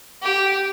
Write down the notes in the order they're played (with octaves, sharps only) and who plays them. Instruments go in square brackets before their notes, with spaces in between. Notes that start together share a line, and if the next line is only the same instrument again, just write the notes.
[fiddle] G4